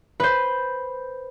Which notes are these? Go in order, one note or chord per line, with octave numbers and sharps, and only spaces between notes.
B4 C5